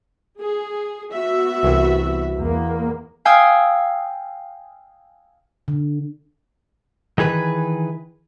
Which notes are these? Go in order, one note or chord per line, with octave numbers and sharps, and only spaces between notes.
G#4
B3 F#4 E5
C2 E3
E2 A#3
F5 G5 G#5 D#6 E6
D3
D#3 E3 G#4 B4